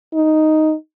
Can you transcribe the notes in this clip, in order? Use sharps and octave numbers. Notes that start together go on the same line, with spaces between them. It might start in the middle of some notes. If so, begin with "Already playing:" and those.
D#4